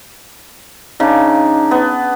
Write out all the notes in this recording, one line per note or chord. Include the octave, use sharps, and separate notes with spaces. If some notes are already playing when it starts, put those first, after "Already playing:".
C#3 D4 D#4
B3